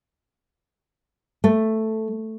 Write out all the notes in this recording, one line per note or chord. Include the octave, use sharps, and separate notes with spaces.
A3